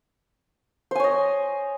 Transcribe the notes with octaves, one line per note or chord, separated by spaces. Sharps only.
C5 C#5 D#5 G#5